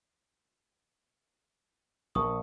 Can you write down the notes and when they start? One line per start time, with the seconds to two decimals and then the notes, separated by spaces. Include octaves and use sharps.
2.15 A#1 A#4 C#6 D#6